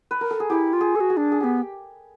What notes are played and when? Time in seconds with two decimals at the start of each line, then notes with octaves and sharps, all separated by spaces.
0.11 B4
0.21 A#4
0.31 A4
0.40 G#4
0.50 E4 G4
0.73 F4
0.81 G#4
0.96 A4
1.00 F#4
1.10 G#4
1.17 D4
1.32 G#4
1.40 D4 G4
1.44 B3